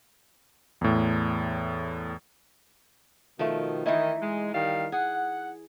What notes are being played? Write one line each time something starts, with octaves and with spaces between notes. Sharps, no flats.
E2 A2
B2 D#3 F3 A3
D#3 E3 D#4 E4 D#5
G#3
D#3 G3 F5
G#4 F#5